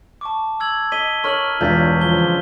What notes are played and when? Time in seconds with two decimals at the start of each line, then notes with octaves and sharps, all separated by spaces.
0.21 A5 C#6 D6
0.60 E6 G#6 F#7
0.92 D#5 B6 D#7 G7
1.24 A#4 C#5 C#6 F6 F#7
1.61 E1 G2 B3 F4 C#5 G6 A6 B6
2.01 C#3 F3 G7